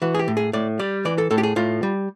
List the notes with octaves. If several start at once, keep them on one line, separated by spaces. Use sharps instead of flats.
E3 F#4
G#4
G4
A2
G#4
A2 D5
G3 D5
E3 D5
A4
A2 A4
G4
G#4
A2 F4
G3